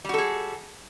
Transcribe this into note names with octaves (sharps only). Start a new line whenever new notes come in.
G3 F#4 G#4 A4